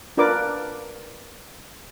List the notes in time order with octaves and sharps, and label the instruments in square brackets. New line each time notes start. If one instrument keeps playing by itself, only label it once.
[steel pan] D4 F4 A#4 B4 D5 D6